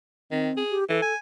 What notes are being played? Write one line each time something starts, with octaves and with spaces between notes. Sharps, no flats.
D#3 C4
G#4
G4
E3 A4
G#5